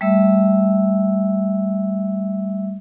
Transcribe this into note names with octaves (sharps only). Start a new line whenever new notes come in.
G3 A3 E5 E6